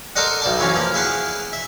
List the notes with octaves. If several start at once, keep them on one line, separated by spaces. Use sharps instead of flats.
A4 A#4 C5 D5 D#5 F#5
B1 D5 A5
E3 F#3 C4 C#4 F4
F3 A#3
E4 G#4 F5 F#5
E5